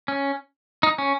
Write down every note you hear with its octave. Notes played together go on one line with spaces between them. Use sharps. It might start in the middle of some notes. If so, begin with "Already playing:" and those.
C#4
D#4
C#4